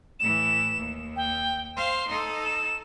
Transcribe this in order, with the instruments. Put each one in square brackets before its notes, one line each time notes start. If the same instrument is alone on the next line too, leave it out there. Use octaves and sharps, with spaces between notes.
[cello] A2 E3 [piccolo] E7
[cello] D#2
[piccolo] G5
[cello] C5 F5 [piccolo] C6
[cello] D#4 A4
[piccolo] E7